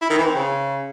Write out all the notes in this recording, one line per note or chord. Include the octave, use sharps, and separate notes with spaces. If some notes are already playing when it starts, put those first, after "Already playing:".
E4
D#3
E3
C4
C#3